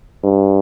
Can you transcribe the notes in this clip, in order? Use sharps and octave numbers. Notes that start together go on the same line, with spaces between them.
G2